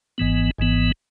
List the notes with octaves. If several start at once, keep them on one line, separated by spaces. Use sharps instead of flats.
G#1 G#2 E3 B3
G#1 G#2 E3 B3